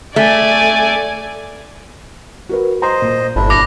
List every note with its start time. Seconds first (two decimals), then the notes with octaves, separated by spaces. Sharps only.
0.16 A3 D5 G#5
2.49 F#4 A#4 B4
2.82 C5 D#5 A#5 C6
3.02 A#2
3.36 G1 D4 E4
3.50 D6 A#6